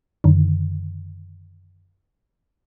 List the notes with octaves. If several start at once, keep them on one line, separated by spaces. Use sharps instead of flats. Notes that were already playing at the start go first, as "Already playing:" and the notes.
F#2 D3 D#3